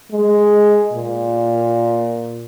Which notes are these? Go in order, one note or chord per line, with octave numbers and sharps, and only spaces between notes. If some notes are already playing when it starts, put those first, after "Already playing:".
G#3
A#2